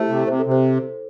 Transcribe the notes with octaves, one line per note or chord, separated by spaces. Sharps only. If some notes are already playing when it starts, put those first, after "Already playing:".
Already playing: A3 E4 G4 C5
C3
C3 C5
A4
C3
C5